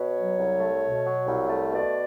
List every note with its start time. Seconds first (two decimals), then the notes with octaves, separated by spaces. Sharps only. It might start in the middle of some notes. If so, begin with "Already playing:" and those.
Already playing: B2 C#5
0.16 F#3
0.38 C2
0.60 A3
0.82 B2
1.05 F#3
1.27 C2
1.49 A3
1.71 B2 D5